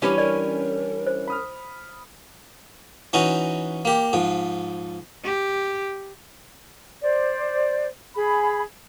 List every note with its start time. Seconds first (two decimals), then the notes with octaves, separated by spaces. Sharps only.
0.02 E3 G3 C#4 D4 G4 B4 C#5
0.18 A#4 D5
1.07 C5
1.27 B5 D#6 F6
3.13 E3 C#4 D#4 F#4
3.85 A#3 G4
4.13 G#2 F3
5.24 G4
7.01 C5 D5
8.15 G#4 B5